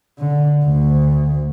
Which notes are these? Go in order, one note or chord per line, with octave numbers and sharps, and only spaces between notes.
D3
D2